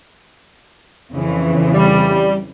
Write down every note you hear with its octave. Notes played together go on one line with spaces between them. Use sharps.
F2 C#3 E3
G3